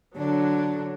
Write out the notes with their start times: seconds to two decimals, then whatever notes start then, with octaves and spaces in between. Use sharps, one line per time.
0.15 D3 F#3 D4